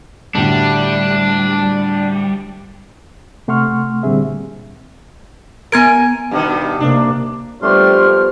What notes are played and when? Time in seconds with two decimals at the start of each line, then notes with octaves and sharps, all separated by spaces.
0.35 D2 A2 D3 G3 D4
3.48 C3 A3 F#5 C6 C#6 F6
4.03 A#2 D3 G3 C4 G#4 E5
5.72 B3 A#4 G#5 G#6 D7
6.31 G2 B2 D#3
6.80 C3 A#3 D4
7.62 F2 G3 A3 B3 D4 C5 C6 F6